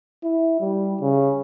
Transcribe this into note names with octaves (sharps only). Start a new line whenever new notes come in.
E4
G3
C#3